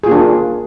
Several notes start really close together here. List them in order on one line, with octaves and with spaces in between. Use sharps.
G#4 F4 A#3 D4